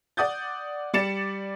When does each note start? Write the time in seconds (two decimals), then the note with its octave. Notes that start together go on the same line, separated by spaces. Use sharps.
0.17 D5 F#5 D#6 G6 A6
0.94 G3 D5 A6 C#7 E7